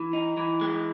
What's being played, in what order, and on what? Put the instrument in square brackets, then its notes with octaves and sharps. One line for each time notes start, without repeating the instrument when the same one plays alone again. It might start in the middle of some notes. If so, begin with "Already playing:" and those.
Already playing: [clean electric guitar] E3
D#4
E3
G#3